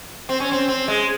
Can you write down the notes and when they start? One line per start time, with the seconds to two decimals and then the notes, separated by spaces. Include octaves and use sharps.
0.29 C4
0.40 C#4
0.52 C4
0.68 C4
0.88 G#3